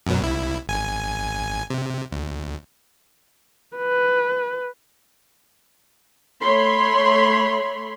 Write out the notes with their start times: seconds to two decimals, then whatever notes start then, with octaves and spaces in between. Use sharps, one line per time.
0.07 F#2 B2 F#3
0.22 C2 E4
0.67 G#1 G#5
1.70 C3
2.12 D2
3.77 B4
6.41 A3 C#5 B5 C6